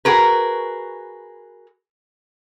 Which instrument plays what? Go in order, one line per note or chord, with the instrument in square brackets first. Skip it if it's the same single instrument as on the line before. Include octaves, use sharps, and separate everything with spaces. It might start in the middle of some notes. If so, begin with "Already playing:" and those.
[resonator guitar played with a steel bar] F#4 G#4 A#4 B4